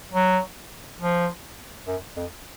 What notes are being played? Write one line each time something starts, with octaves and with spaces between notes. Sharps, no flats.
F#3
F3
F#2
F2